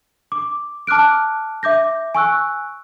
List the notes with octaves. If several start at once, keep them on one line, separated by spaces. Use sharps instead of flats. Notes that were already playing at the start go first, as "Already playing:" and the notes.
D6
A5 D6 F6 F#6 D7
E5 D6 G6 A#6
G#5 C#6 E6 F#6